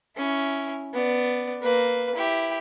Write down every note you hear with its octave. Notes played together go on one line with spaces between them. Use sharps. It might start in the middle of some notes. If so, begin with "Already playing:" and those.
C#4 E4
B3 D5
A#3 B4
E4 G4